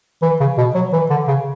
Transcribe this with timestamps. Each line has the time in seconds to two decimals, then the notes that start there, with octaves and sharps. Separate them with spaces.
0.22 E3
0.40 C#3
0.58 B2
0.75 F#3
0.93 E3
1.10 D3
1.28 C#3